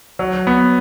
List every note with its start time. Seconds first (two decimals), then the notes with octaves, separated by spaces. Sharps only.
0.19 F#3
0.47 B3